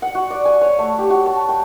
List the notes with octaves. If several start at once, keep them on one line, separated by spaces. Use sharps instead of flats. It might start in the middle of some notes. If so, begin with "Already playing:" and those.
F#5
F#4
D5
G#5
C#5
A3
G4
F#4
A5
G5